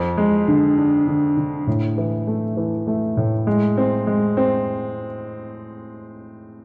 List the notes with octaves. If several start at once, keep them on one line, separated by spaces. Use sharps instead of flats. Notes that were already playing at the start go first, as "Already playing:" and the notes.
Already playing: F2
G#3
D3
D4
D3
D3
A2
E3
A3
E3
A3
A2
G#3
C4
G#3
C4